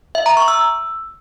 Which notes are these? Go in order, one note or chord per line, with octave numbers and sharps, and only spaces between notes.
E5
A#5
C#6
E6